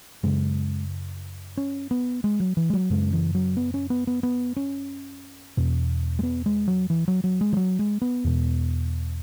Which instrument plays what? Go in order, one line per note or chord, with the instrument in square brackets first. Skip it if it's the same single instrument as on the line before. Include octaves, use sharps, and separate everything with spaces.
[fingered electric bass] F#2 C#3 G#3
C#4
B3
G#3
F#3
E3
G#3
F#3
F#2 C#3 G#3
E3
F#3
B3
C#4
B3
B3
B3
C#4
E2 B2
G#3
B3
G#3
F#3
E3
F#3
F#3
G#3
E3
F#3
G#3
B3
E2 B2